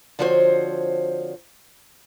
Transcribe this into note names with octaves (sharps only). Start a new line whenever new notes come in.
D3 F3 C4 F#4 C5 C#5